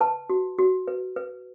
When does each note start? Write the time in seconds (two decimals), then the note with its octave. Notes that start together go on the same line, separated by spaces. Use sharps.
0.01 B4 A5
0.30 F#4
0.58 F#4
0.88 B4
1.16 B4